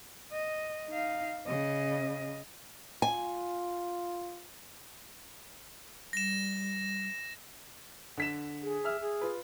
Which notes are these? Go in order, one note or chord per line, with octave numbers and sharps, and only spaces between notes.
D#5
D#4 F5
C#3 D#5
F4 G#5
G3 A#6 E7
D3 B6 E7
G#4
E5 E6 F6
G#4
F4 B4